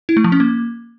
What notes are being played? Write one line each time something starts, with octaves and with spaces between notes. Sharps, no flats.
E4
A3
F3
C#4
A#3